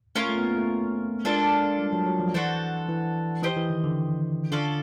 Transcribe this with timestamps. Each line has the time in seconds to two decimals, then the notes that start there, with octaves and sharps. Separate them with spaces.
0.16 A3 C#4 F4 A#4 C#5
0.29 A3
0.38 B3
0.43 A#3
0.57 A3
1.25 G#3 A#3 D4 F4 A4
1.79 G3
1.93 F#3
2.06 F#3
2.20 F3
2.34 E3 D4 F#4 A4 C5
2.88 E3
3.43 E3 G4 C5 D#5
3.57 E3
3.70 D#3
3.84 D3
4.52 D3 C#4 F4 A4 D5